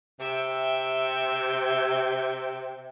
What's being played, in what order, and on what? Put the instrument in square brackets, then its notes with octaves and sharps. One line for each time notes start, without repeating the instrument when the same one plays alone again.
[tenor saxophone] C3 [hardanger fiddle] E5 G5